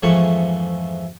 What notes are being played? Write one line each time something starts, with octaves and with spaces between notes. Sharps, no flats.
F2 G#2 E3 F3 A3 C#6